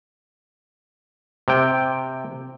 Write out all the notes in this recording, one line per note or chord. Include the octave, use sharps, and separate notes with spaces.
C3 G5